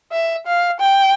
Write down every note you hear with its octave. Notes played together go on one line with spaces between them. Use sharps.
E5
F5
G5